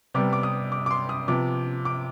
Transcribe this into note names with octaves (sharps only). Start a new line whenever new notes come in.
C3 G3 B3 D6
D6
D#6
D6
D6
C6
D#6
C3 F3 B3 D6
D6